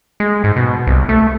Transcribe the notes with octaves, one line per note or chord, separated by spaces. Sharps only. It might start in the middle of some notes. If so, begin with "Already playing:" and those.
G#3
G#2
B2
C2
A3